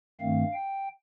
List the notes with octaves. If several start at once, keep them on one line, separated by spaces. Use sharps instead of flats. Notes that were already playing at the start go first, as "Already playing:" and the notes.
G2 D#3 A3 C4 F5
G5